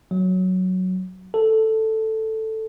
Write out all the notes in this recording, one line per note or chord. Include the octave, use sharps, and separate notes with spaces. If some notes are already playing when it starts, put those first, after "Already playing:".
F#3
A4